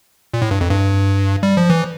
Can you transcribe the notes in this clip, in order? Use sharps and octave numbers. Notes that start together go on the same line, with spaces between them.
A#2
A2
G2
F2
G2
G3
F3
E3